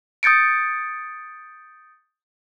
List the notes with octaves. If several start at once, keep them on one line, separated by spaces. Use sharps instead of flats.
D#6 G6 A6 C#7 D7